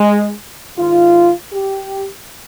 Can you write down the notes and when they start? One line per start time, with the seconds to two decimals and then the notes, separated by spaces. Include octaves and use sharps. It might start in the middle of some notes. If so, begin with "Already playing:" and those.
Already playing: G#3
0.77 G#2 D#3 F4
1.52 G4